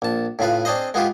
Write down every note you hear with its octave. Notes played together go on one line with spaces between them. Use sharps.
A#1 A5
A2 C#3 F4 B4
C4 D4 G#4 C5 D#5
G#3 B3 F4 G4 G#4